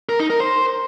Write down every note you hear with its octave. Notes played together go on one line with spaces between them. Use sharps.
A#4
D#4
A#4
C5